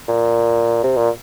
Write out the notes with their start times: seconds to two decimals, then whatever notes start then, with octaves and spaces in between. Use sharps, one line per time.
0.08 A#2
0.84 C3
0.97 A#2